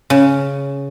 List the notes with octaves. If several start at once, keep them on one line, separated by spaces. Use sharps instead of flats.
C#3